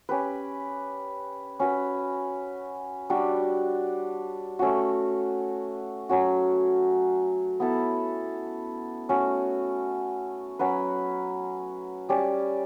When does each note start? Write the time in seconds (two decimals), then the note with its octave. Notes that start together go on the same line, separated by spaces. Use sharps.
0.09 C#4 G4 B4
1.60 C#4 F#4 B4
3.10 G3 D4 F#4
4.59 A3 C#4 F#4
6.09 F#3 C#4 F#4
7.60 B3 E4 A4
9.09 A3 C#4 F#4
10.59 F#3 C#4 F#4 B4
12.09 G3 C#4 G4 D5